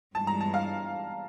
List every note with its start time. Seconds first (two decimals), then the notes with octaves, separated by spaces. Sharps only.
0.14 G2 E3 G#3 A5
0.27 A#5
0.41 A5
0.54 F5